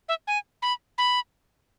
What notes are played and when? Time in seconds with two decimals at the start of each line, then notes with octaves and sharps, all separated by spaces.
0.09 E5
0.27 G#5
0.62 B5
0.98 B5